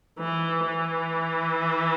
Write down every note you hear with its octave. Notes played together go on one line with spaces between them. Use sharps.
E3
E3